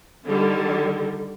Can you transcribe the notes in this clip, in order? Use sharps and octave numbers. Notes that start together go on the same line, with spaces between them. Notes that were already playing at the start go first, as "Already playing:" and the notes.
D3 D#3 G3